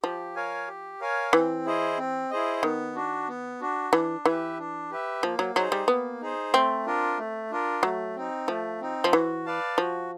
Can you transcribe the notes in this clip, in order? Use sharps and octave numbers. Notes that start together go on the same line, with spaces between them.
F3 G4
A#4 C#5 F5 G#5
G4
A#4 C#5 F5 G#5
E3 C4
E4 G#4 C5 D#5
C4
E4 G#4 C5 D#5
D#3 B3
D4 F#4
B3
D4 F#4
E3 D4
E3 G4 B4 E5
D4
G4 B4 E5
F3 A#3
F#3
F#3 D#4 G#4 C5
G3
A#3 B3
D#4 G#4 C5
A3 C4
D4 F4 A#4
A3
D4 F4 A#4
F#3 A3
C4 D#4
F3 A3
C4 D#4
F3
E3 F#4
B4 D5 F5 A5
F3 F#4